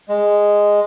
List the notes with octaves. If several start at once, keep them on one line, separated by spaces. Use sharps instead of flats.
G#3